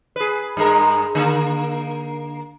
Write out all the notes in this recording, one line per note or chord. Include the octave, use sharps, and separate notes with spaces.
G#4 B4
G2 G#3 A#4
D3 A#3